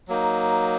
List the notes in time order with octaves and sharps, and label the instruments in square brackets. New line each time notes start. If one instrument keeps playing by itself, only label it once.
[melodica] F#3 A#3 D#4